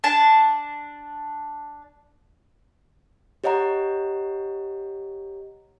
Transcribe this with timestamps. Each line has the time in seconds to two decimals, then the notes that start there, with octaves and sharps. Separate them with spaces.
0.04 D4 A5
3.44 G4 C#5 D#5 F#5 A#5